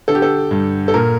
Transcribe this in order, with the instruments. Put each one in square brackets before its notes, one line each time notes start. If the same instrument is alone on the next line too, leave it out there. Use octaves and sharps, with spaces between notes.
[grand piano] D3 A4
G4
A4
G2
A4
A#2 A#4